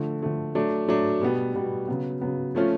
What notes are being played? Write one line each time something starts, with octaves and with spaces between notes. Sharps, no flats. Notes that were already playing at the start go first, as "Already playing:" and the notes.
Already playing: D3 F3 A3
D3 F3 A3
F#3 A3 D4
F#3 A3 D4
B2 G3 B3
B2 G3 B3
C#3 F#3 B3
C#3 F#3 B3
F3 A3 C#4 F4